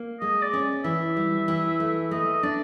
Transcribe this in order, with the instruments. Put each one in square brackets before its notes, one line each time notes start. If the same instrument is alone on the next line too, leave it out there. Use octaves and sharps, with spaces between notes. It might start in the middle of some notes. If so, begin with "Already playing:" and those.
Already playing: [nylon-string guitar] A#3
[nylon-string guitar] G#3 [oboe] D#5
[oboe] D5
[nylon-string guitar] C#4
[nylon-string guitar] E3 [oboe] E5
[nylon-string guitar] G3
E3
A3
[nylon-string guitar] A3 [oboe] D#5
[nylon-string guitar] D4 [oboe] D5